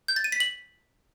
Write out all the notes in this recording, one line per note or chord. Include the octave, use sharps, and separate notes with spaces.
G6
A6
D#7
B6
F#7